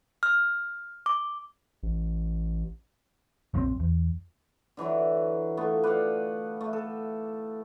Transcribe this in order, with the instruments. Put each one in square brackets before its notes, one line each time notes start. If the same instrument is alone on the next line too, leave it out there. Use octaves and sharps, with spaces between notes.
[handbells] F6
D6
[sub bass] A1
[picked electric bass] A#1 F#2 D3 C4
E2
[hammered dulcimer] D3 E3 F#3 E4
A3 B3 F4 A4
B4 D5 F5 F#5
A3
A4